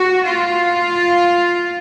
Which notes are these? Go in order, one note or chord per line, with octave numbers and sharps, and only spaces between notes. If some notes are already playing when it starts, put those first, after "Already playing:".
Already playing: F#4
F4